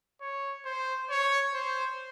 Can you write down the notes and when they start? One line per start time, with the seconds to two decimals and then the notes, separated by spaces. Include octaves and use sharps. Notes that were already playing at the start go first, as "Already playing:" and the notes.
0.21 C#5
0.65 C5
1.10 C#5
1.54 C5